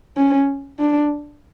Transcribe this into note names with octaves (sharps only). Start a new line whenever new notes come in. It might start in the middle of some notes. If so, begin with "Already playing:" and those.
C#4
D4